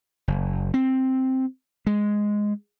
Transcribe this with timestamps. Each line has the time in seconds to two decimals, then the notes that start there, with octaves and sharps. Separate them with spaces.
0.28 F#1
0.74 C4
1.87 G#3